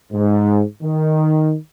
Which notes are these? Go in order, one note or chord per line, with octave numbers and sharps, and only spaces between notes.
G#2
D#3